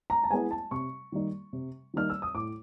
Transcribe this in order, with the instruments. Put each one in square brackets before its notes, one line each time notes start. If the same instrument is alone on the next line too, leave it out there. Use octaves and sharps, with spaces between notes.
[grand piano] A#5
A5
G#3 B3 E4 G#5
A5
C3 C#6
D#3 G3 A#3 D#4
C3
D#3 G3 A#3 D#4 F6
E6
D#6
A2 D6